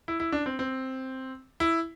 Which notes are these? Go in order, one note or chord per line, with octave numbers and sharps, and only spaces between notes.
E4
E4
D4
C4
C4
E4